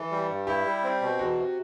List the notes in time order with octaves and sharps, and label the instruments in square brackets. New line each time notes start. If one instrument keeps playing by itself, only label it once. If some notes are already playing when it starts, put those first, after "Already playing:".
Already playing: [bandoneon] E3 [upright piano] A4
[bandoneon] G3
G2
[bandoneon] E4 [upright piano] G4
[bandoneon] G3
C4
B2
[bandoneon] E2 [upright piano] F#4
[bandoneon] C3